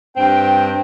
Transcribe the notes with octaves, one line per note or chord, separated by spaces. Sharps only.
G2 C4 G5